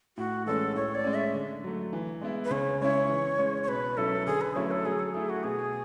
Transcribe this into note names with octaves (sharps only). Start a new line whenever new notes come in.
A2 F#4
E3 G#3 C#4 A4
A2 C#5
D5
G#3 C#4
E5
D3
F#3 A3
E3
G#3 B3 E4
B4
C#3 C#5
G#3 C#4 E4 C#5
E3
G#3 C#4
C#5
B2 B4
F#3 C#4 E4 A4
D3 G#4
B4
F#3 A3 C#4 E4 C#5
A4
F#3 G#4
A4
A3 E4 G#4
F#4
B2 G#4